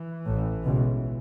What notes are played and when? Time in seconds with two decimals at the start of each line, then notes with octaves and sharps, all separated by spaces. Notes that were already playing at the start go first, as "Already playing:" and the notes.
Already playing: E3
0.25 A1 A2
0.64 C#2 B2